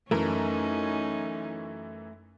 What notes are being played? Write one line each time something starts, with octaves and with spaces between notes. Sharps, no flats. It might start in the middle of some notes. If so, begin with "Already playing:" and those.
F#2 E3 A3 C#4 D#4 A#4